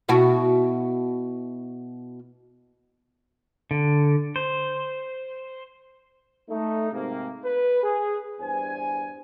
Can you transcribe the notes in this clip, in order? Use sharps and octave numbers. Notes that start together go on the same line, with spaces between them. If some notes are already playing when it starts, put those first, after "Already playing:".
B2 E4 F#4
D3
C5
A3 D#4
G#2 C3 A#3
B4
G#4
E2 G2 C5 G#5